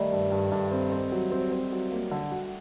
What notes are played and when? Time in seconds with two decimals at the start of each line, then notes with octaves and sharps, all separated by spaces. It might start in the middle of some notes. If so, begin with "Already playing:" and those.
Already playing: D#3 G3 A3
0.12 G2
0.32 G2
0.52 G2
0.72 C4
0.92 C4
1.12 F#3
1.32 C4
1.52 C4
1.72 F#3
1.92 A#3
2.11 D3
2.31 F#4